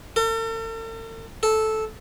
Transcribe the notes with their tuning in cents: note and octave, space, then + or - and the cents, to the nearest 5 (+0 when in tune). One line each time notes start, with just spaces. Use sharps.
A4 +45
A4 -10